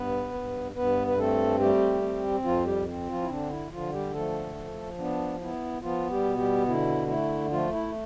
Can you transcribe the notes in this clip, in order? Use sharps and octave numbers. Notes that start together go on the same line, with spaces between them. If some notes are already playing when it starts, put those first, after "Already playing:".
Already playing: G2 B3 B4
G2
G2 B3 B4
B4
A3 C4 A4
G3 A3 G4
C4
F2 F3 F4
G3 G4
C4
F3 F4
E4
D3 D4
E4
D3 F3 F4
G3 G4
F3 A3 A4
F3
B3 D4
B3 E4
F3 B3 F4
G3 G4
B2
G3 G4
D3 E4
A3 E4
F3 A3 F4
E4